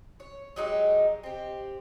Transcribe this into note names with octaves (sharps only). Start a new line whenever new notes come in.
C#5
F#3 G#3 D#4 G4
C4 G4